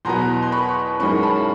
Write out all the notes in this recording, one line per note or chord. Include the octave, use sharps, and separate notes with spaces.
E2 B2 F#3 B3 A#5 C6
C6
B5 C#6
F#2 D#3 G#3 C#4 B5 C#6
A5 B5
A5